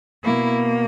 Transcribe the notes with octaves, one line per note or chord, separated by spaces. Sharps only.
B2 A#3 E4